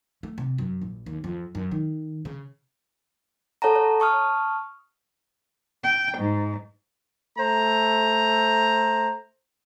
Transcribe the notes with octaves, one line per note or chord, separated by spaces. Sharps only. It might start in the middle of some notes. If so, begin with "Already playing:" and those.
A3
C3
F#2
A#1
D#2
F2
F#2
D#3
C#3
A4 C#5 F#5 A5 A#5
C#5
A5 C#6 D#6 F6
G5
G#2
A3 C5 A#5